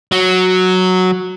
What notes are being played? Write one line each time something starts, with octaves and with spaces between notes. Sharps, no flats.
F#3